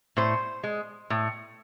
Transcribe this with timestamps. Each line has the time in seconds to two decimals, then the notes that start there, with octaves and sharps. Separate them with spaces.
0.17 A2 C5
0.64 G#3
1.10 A2